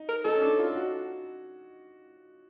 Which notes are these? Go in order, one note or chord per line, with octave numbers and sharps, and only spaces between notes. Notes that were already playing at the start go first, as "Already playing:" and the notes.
Already playing: D#4
A#4
D#4 A4
C#4
D4
F4
F#4